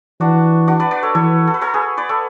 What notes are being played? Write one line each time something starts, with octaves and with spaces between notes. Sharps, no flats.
E3 D4 F#4
D4 F#4
B4 D5
B4 D5
A4 C#5
E3 A4 C#5
A4
B4
A4 C#5
G#4 B4
B4 D5
A4 C#5